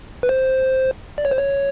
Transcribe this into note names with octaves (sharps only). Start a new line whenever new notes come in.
B4
C5
D5
C#5
C5
C#5